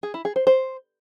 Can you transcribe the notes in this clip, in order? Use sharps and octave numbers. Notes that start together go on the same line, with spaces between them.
G#4
E4
G#4
C5
C5